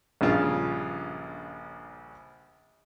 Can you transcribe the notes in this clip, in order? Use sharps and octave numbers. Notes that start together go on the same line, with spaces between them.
A#1 G2 C#3 F4